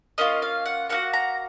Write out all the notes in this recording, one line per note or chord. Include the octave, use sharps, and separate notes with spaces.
A#3 C#4 F4 D#5
F5
F#5
A#3 D#4 F#4 F#5
A#5